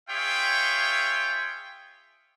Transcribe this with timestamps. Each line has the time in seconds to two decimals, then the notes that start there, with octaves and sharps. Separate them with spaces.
0.10 F4 G#4 C#5 E5 G5